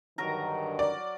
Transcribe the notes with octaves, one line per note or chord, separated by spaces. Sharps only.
G2 D3 D#3 F#3 A#4 A#5
D5